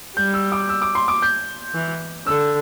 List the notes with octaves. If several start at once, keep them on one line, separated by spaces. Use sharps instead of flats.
G3 G6
E6
D6
E6
D6
C6
D6
G6
E3
D3 E6